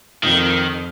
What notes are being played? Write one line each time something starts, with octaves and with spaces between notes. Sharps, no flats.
F2 D#3